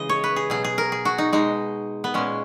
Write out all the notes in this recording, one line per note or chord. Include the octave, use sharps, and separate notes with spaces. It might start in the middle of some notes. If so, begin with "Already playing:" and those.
Already playing: C#3 E3 G#3 D#5
C#5
B4
G#4
B2 F#3 G#4
G#4
A#4
G#4
F#4
D#4
B2 G#3 D#4
B3
A#2 G#3 C#4